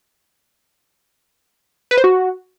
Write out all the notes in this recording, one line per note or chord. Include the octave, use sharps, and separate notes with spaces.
B4
C5
F#4